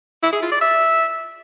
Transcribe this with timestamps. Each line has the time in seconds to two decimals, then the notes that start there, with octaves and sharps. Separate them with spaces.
0.23 E4
0.32 G#4
0.42 F4
0.52 D5
0.61 E5